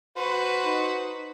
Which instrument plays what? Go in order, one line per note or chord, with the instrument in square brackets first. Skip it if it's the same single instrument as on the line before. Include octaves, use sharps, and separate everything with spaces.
[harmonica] F#4 C5 [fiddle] B4
[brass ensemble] D#4